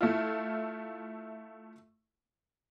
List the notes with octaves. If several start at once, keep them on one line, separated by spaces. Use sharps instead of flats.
A3 E4 F4